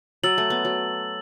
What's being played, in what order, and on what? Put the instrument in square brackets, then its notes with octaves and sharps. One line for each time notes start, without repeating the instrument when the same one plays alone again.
[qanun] F#3 [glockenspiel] E6 A6 F#7
[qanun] A3
B3
F#3